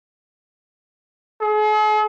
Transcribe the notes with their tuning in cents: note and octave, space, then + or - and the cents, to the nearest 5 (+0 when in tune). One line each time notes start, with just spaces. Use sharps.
G#4 +45